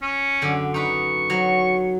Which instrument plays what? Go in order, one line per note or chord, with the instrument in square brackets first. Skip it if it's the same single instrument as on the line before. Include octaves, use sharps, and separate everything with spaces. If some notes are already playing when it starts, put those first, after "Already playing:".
[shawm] C#4
[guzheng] F#2 D3
[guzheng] D#4 B4 [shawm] C#6
[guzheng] F#3